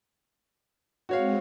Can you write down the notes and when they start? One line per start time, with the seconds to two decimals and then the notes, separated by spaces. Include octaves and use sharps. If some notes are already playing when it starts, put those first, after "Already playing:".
1.09 G#3 C4 F#4 C#5 F5